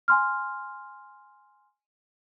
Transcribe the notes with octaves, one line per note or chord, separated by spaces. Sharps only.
G#5 C6 F6